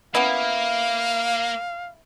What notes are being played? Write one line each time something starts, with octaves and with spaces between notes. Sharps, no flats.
A#3 B3 C#4 E4 F5